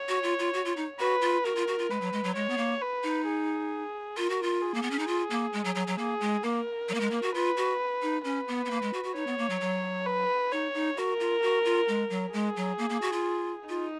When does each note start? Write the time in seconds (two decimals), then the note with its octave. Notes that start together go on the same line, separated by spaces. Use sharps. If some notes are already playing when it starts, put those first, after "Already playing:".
Already playing: C#5
0.09 F#4
0.23 F4
0.39 F4
0.54 F#4
0.65 F4
0.77 D#4
0.99 F#4 B4
1.22 F4
1.44 F#4 A#4
1.56 F4
1.68 F#4
1.79 F4
1.90 G#3 B4
2.01 F#3
2.13 G#3
2.24 F#3
2.36 G#3 C#5
2.49 B3
2.58 A#3
2.81 B4
3.03 D#4
3.26 G#4
4.16 F4 A#4
4.30 F#4
4.43 F4
4.62 G#4
4.74 A#3
4.82 B3
4.91 C#4
4.99 D#4
5.07 F4
5.30 A#3
5.53 G#3
5.65 F#3
5.75 F#3
5.87 F#3
5.98 A#3 G#4
6.21 G#3
6.43 A#3 A#4
6.89 F#3
6.94 A#3
7.00 G#3
7.11 A#3
7.22 F#4
7.35 F4 B4
7.57 F#4
8.02 D#4
8.24 C#4 B4
8.48 B3
8.65 B3
8.71 A#3
8.82 G#3
8.93 F#4
9.04 F#4
9.15 D#4 C#5
9.27 B3
9.38 A#3
9.50 F#3
9.61 F#3
10.06 B4
10.52 D#4 C#5
10.74 D#4
10.97 F#4 A#4
11.20 F4
11.43 F#4
11.65 F4
11.88 G#3
12.10 F#3
12.33 G#3 G#4
12.56 F#3
12.78 A#3
12.90 A#3
13.02 F#4
13.13 F4
13.69 D#4 F4